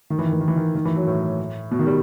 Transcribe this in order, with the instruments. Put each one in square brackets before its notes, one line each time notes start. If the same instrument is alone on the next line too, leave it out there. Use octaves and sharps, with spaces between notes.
[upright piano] D#3
E3
D#3
E3
D#3
E3
D#3
D#3
E3
F#3
A2
B2
D#3
G3